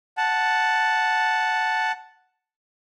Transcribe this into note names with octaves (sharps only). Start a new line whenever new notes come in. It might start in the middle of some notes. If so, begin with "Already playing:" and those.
F#5 A5